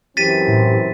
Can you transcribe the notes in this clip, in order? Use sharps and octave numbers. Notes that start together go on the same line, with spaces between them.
F#2 E3 C4 G4 A6 B6 D#7
A2